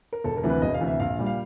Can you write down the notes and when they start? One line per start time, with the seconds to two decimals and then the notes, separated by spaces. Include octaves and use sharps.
0.13 A#4
0.24 E1 A4
0.37 A#4
0.43 D2 C3 E3
0.50 B4
0.62 E1 D#5
0.74 F5
0.81 D2 C3 E3
0.87 E5
1.00 A#1 F5
1.19 A#2 G3
1.26 F5